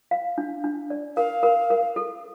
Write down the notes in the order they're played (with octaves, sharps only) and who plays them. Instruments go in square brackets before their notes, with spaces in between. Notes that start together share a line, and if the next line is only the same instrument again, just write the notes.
[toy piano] F5
D4
D4
D5
[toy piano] A#4 [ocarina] F5
[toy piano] A#4
A#4
A4